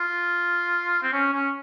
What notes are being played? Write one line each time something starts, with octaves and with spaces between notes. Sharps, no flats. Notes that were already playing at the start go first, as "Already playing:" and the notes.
Already playing: F4
C4
C#4
C#4